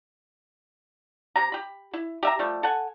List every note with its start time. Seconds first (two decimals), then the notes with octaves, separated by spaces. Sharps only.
1.36 C3 G4 A#5
1.52 G4 B5
1.93 E4
2.23 G4 E5 A#5
2.39 F3 G3 A3
2.63 A4 F#5 G#5